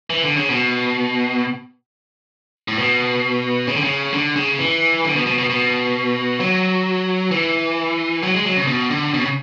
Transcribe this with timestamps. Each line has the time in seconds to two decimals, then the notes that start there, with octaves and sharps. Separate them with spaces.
0.10 E3
0.23 D3
0.37 C#3
0.50 B2
2.68 A2
2.77 B2
3.68 C#3
3.76 D3
3.84 C#3
4.14 D3
4.36 C#3
4.59 E3
5.04 D3
5.16 B2
5.27 B2
5.38 B2
5.50 B2
6.40 F#3
7.31 E3
8.23 F#3
8.34 G#3
8.45 F#3
8.56 C#3
8.67 B2
8.91 D3
9.14 B2
9.21 C#3